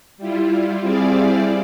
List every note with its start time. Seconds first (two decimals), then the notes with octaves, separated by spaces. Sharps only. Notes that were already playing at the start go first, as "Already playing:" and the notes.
0.18 G3 E4 F4
0.81 G3 C4 E4 G#4 D5 F5